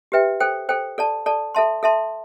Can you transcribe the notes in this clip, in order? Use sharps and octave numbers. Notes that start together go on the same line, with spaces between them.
G4 B4 E5 G5
A4 C5 G5
A4 C5 G5
A4 D5 A5
A4 D5 A5
A4 E5 A5 C6
A4 E5 A5 C6